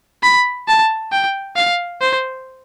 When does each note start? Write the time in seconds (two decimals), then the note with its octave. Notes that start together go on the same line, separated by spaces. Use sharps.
0.23 B5
0.68 A5
1.12 G5
1.56 F5
2.01 C5